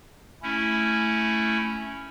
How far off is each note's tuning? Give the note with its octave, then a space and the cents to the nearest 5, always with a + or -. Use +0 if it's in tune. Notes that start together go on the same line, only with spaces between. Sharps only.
A3 +0 C#4 +0 E4 +0